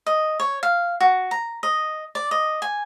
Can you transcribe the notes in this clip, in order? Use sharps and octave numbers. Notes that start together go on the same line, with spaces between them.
D#5
C#5
F5
F#4
A#5
D#5
D5
D#5
G#5